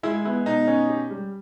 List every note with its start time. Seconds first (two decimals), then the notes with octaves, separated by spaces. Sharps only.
0.03 G#3 E4
0.25 B3 E4
0.46 B2 D#4
0.68 C#4
0.89 G4
1.10 G3